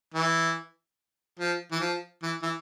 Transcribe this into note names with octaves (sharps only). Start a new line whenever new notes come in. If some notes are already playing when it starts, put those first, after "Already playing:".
E3
F3
E3
F3
E3
E3